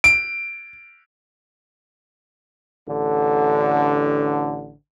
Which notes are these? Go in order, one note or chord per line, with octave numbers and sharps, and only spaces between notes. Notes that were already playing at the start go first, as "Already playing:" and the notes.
D7
A1 D3